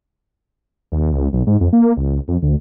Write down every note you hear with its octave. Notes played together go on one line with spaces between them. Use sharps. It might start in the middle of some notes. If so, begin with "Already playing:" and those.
D#2
C#2
B1
G#2
F2
A#3
C#2
F2
D2